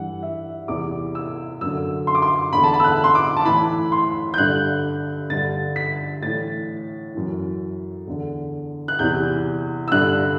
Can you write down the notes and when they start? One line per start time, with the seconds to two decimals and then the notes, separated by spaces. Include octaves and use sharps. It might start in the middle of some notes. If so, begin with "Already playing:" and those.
Already playing: G2 E3 F#5
0.23 E5
0.68 E2 C3 E3 D6
1.15 E6
1.61 F#2 D3 E6
2.07 C6
2.15 D6
2.22 C6
2.53 E2 D3 B5
2.64 A5
2.74 B5
2.80 E6
2.84 F#6
3.04 C6
3.15 D6
3.37 A5
3.45 A2 E3 B5
3.92 C6
4.34 G6
4.38 G2 D3 F#6
5.30 G2 D3 A6
5.76 B6
6.22 A2 E3 A6
7.15 F#2 E3
8.07 E2 D3
8.88 F#6
8.99 E2 C3 E3 G6
9.88 E6
9.92 G2 D3 F#6